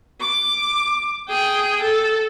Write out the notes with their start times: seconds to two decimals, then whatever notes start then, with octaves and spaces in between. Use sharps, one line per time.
0.20 D6
1.28 G#4 G5
1.82 A4